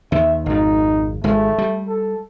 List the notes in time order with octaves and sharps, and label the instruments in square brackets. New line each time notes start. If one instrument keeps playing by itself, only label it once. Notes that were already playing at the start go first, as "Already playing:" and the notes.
[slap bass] D#2 D#3 [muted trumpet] E5
[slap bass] G#1 F2 [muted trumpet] D#4
[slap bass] G#1 G#3 [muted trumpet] A3
[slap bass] G3
[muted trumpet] A4